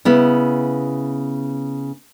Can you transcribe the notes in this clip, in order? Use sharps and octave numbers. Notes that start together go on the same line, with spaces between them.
C#3 B3 E4